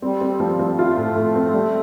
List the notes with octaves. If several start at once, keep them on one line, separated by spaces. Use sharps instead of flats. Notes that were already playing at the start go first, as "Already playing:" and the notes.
G3 C4
C4
F3
F3
A3 F4
A2
A2
C4
G3